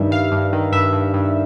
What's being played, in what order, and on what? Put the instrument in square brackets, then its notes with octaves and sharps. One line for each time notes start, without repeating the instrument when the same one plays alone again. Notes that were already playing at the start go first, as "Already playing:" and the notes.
Already playing: [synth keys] G2 D#3 G3 E5
G2 F5
G2
D#3
G2 E5
G2
G2